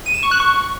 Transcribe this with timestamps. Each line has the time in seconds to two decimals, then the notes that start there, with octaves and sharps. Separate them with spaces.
0.06 D#7
0.14 E7
0.23 C#6
0.31 F#6
0.40 C#6